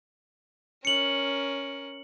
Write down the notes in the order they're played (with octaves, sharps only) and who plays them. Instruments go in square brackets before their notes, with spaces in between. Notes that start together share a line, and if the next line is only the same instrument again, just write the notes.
[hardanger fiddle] C#4 A#4 [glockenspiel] C#7 F#7